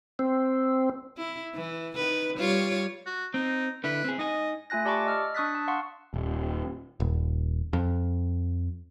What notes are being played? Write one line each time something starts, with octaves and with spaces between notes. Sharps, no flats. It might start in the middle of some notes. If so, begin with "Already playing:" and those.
C4
E4
E3
D#3 B4
G3 F4 C#5
F#4
C4 D#4
D3 E4 B4
C4 G#4
D#4 D#5 G#5
A3 F4 G#5 F#6 A#6
G4 D5 A5 B5 C#6 D6
D#5 E6 F6
D4 C#6 D#6 F#6 A6 B6
A5
F5 F#5 C6 C#6
D#1
D#1
F2